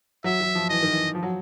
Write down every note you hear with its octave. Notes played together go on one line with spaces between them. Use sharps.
F#3 E5
F#3
F3
E3 D#5
D#3
E3
F3
F#3